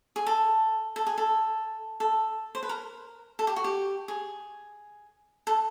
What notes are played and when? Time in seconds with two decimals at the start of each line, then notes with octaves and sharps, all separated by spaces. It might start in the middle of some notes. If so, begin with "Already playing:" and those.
0.16 G#4
0.27 A4
0.96 A4
1.07 G#4
1.18 A4
2.00 A4
2.55 C5
2.63 B4
2.69 A#4
3.39 A4
3.47 G4
3.56 F#4
3.64 G4
4.08 G#4
5.47 A4